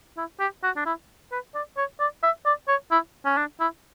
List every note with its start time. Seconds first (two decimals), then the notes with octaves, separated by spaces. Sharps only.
0.17 E4
0.40 G4
0.63 F#4
0.76 D4
0.86 E4
1.32 B4
1.55 D5
1.77 C#5
2.00 D5
2.23 E5
2.46 D5
2.68 C#5
2.91 E4
3.25 C#4
3.37 D4
3.60 E4